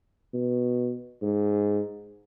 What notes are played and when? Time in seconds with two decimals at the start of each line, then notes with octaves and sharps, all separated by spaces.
0.34 B2
1.22 G#2